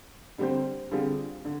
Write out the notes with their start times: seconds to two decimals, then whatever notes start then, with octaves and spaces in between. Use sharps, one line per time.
0.38 D3 G3 C4 G4 C5
0.91 D3 G3 C4 F4 G#4
1.45 D3